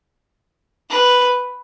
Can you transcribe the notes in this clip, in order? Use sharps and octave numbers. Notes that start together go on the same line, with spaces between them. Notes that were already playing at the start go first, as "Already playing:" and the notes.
B4